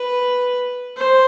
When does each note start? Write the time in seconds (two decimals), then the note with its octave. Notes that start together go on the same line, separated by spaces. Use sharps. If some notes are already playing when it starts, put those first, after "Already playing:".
Already playing: B4
0.96 C5